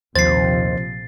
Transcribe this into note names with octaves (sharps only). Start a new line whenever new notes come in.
A#1 D#2 C3 F3 C5 A6 C7